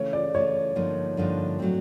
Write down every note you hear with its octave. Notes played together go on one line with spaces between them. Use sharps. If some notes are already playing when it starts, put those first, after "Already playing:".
Already playing: C#3 E3 A3 C#5
D5
C#3 E3 A3 C#5
G2 D3 F3 A#3 D#4
G2 D3 F3 A#3 D#4
A2 F#3 A3 C4